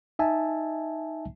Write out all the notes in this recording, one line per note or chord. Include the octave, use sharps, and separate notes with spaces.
D#4 D#5 E5 G#5 A5